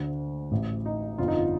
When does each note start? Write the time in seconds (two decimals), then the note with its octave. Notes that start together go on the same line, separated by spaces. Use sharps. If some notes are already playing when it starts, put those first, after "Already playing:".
Already playing: D2 D3 C5
0.51 A1 A2
0.85 D#4
1.18 G1 F2 D3 F4
1.28 D#4
1.35 F4